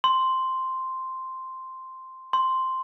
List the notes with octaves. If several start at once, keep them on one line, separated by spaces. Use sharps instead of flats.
C6
C6